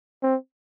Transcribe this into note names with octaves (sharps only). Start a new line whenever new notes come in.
C4